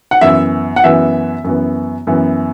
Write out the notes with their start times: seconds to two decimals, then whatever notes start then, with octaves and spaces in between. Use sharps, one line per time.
0.11 F#5
0.21 F#2 E3 B3 E5
0.76 F#5
0.84 F#2 E3 B3 E5
1.44 F#2 E3 B3
2.07 F#2 E3 B3